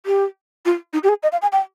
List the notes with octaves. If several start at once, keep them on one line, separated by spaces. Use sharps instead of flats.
G4
F4
D#4
G4
G#4
D#5
F5
G#5
G5